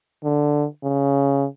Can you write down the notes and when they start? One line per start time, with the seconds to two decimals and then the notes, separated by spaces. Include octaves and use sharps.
0.24 D3
0.83 C#3